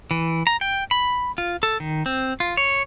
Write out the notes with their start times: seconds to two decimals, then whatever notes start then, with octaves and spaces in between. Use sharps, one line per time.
0.11 E3
0.47 A#5
0.61 G5
0.91 B5
1.38 F4
1.63 A4
1.80 D#3
2.06 C4
2.40 F4
2.57 C#5